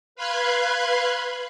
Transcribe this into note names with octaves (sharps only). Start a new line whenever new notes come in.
B4 F5 B5 C6 F#6 G#6